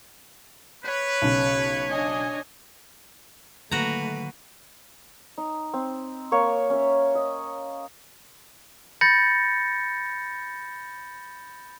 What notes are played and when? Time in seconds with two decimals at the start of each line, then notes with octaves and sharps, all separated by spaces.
0.85 B4 C#5
1.22 B1 C#3
1.90 D4 D#5 G#5
3.71 D3 D#3 F#3 A3 A#3 F#4 B4 A#5
5.38 D#4
5.73 C4
6.32 A#3 C#5 C#6
6.70 C#4 E5
7.15 D#5
9.01 B5 G6 A6 A#6 C#7